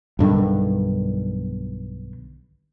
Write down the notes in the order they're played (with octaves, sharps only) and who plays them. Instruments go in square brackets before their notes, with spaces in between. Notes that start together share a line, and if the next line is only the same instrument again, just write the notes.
[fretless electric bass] B1 G2 D3 D#3